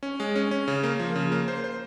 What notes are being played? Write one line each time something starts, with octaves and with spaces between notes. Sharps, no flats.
C#4
G#3
C#4
C#4
C#3
A#3
F3
C#3
A#3
C5
C5